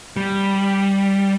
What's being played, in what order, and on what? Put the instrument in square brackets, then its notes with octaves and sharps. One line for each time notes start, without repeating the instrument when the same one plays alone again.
[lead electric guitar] G3